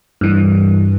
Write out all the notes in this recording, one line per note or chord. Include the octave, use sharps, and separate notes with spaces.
G2 E3